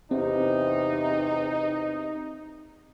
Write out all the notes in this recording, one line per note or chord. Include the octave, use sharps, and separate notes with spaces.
E2 C3 C4 D#4